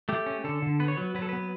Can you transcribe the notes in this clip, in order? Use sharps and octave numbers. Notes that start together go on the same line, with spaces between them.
A3 G4
C#4
D3 A4
D3
B3 B4
C#5
F#3 B4
F#3 B4
A4
B3 B4